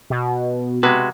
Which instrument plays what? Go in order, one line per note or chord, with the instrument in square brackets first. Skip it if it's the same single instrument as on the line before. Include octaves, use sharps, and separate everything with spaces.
[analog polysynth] B2
[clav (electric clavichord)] C3 G#3 [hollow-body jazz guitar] F#4 B4